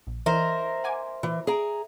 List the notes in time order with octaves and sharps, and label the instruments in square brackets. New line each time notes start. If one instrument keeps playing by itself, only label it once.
[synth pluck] A#1
[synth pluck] E3 [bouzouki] A#4 C5 [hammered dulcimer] E5
[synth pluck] F#5 G#5 D6
[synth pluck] A#2 [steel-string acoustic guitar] E3
[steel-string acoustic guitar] G#4 A#5 [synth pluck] D7